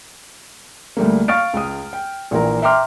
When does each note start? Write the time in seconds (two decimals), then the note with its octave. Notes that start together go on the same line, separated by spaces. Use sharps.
0.97 D2 G3 A3 A#3
1.28 F5 C#6 F6 A6 D7
1.54 C#2 D#6
1.93 G5
2.31 A#1 A#2 E3 A#4 A#5
2.62 E5 G5 A#5 C6 D6 F6